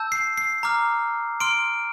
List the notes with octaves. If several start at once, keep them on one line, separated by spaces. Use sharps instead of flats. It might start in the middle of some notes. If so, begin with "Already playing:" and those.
Already playing: A5 E6 G6
C7
C7
A#5 D6 F6
C6 F6 D7